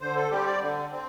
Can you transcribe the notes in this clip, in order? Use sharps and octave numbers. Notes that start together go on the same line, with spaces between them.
D3 C5
A4
G3 C4 G4
D5
D3
C4